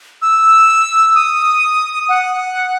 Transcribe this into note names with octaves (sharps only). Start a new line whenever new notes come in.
E6
D#6
F#5